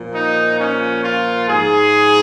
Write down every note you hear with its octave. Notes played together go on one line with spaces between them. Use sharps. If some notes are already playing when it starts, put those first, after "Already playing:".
Already playing: A#2 F3
D#4
C#4
F4
G#2 F3 G#4